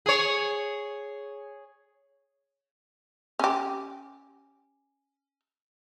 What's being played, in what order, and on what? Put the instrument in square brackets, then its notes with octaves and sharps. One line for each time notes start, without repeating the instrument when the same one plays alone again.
[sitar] G#4 C#5
[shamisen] C#4 G4